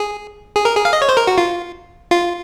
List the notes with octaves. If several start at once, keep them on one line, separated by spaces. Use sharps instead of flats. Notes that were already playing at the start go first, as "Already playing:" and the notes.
Already playing: G#4
G#4
A#4
G#4
F5
D#5
C#5
C5
A#4
F#4
F4
F4